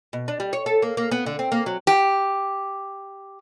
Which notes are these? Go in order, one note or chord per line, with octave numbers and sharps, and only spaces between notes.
B2
D4
G3
C#5
A4
A#3
A#3
B3
D3
C4
A#3
F#3
G4